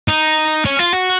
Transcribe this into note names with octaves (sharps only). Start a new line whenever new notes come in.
D#4
C#4
F4
F#4